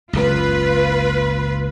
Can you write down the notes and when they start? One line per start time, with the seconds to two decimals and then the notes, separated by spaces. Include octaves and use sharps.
0.13 F#1 C#2 F4 B4